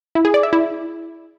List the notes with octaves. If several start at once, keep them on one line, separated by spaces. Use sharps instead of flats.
E4
G#4
D5
E5
E4